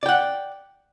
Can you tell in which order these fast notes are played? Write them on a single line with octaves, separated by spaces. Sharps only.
D5 G5 F#5